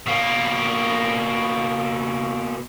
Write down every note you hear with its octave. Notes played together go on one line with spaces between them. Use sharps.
B2 A#3